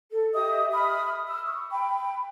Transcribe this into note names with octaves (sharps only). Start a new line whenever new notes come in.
A4
G4 D#5 E5 D#6
E5 B5 D#6 F6
E6 F6
C#6
G5 B5